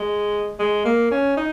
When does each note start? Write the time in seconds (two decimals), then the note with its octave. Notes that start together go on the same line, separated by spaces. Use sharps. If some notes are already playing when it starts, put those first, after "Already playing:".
Already playing: G#3
0.59 G#3
0.85 A#3
1.11 C#4
1.37 D#4